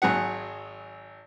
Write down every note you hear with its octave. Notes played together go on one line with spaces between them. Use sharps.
G#1 F#3 G#4 F#5